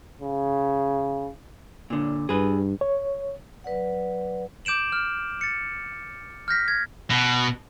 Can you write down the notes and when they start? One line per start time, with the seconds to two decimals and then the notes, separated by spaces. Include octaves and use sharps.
0.21 C#3
1.90 A#2 D3
2.29 G2 G#4 B4
2.81 C#5
3.64 F#3 B4 D5 F#5
4.65 D6 G6 D7 E7 F#7
4.92 F6
5.41 A6 C#7
6.48 F6 G6 A#6 B6
6.68 G#6
7.11 B2